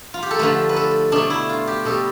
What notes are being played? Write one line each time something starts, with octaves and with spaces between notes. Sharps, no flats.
F4
G4
A4
D3 F3 A3 B4
B4
A4
B2 A3 D4
E4
F4
G4
B2 G3 A4